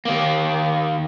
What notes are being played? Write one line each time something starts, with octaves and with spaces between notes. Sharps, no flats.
D#2 A#3